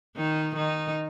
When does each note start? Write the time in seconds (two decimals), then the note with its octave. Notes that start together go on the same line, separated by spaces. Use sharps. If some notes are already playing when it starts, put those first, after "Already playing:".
0.17 D#3 D#4
0.56 D#3 D#4